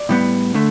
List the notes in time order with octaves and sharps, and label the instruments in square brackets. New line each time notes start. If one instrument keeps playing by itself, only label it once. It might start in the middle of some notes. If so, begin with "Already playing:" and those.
Already playing: [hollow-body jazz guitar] D5
A2 G3 B3
D3 A3